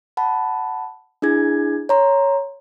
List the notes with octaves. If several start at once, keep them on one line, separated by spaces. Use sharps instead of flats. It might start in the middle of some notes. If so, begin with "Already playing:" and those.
F#5 A5 B5
D4 E4 G#4 G#6
C#5 A#5 C6